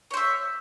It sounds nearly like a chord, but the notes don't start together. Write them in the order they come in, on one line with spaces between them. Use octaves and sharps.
C#5 C5 E5